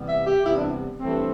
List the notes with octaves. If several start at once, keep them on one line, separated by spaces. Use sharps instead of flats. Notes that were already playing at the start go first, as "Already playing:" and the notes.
Already playing: E2 C3 G3 B3
E5
G4
E2 C3 G3 B3 E4
D4
G2 E3 A3 C4